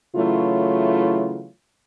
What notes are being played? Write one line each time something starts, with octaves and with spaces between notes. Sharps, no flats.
C#3 E3 F#3 A3 E4 F4